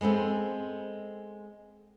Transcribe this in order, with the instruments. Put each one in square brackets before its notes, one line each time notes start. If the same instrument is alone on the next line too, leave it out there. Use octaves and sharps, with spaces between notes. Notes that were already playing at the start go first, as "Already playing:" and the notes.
[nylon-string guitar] G#3 B3 C4 A4